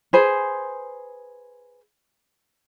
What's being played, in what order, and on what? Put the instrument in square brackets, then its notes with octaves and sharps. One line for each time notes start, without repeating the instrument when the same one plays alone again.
[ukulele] G#4 B4 C5 G#5